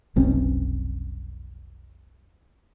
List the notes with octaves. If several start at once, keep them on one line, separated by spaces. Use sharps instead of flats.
F1 B1 C4 C#4